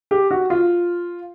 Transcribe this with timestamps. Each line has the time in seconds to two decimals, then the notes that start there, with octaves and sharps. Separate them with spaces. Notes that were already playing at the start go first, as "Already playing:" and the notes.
0.11 G4
0.31 F#4
0.50 F4